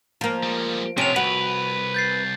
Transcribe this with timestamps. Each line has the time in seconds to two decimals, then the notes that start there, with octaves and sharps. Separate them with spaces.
0.21 F3 A#3
0.43 G3 G#3
0.98 C3 F3 B3 C#4 D7 D#7 F7
1.16 C2 F#4 B4
1.94 G6 A6 C7